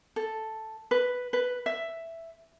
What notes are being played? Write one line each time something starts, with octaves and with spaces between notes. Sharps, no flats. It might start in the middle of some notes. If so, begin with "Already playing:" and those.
A4
B4
B4
E5